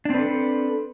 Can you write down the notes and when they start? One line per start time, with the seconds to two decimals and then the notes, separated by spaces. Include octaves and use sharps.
0.05 D4
0.10 C4
0.14 B4
0.19 A4